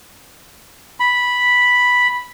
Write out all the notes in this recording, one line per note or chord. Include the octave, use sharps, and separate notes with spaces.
B5